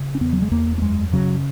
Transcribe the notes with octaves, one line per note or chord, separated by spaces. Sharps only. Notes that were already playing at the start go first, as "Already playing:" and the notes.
Already playing: C#3
C#4
E2 B3
F#3
G#3
E2 A#3
A#3
F#2 G#3
C#3 F#3